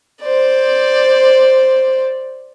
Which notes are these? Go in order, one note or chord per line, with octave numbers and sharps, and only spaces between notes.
C5 D5